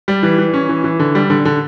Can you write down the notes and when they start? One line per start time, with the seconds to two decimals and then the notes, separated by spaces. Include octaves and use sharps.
0.08 G3
0.23 E3
0.38 E3
0.53 C#4
0.69 E3
0.84 E3
1.00 D3
1.15 G3
1.30 D3
1.45 D3